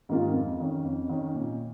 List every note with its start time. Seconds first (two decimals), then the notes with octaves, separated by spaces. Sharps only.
0.09 G#2 D#3 A#3 F4
0.34 F2
0.60 D#3 C#4
0.84 F2
1.09 D#3 C#4
1.35 A#2